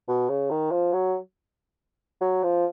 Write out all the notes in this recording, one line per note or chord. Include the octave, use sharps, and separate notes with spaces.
B2
C#3
D#3
F3
F#3
F#3
F3